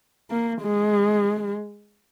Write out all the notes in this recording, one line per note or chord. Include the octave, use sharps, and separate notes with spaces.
A#3
G#3